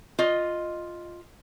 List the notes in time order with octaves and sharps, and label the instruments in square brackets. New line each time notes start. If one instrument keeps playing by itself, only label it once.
[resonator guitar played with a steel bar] F4 D#5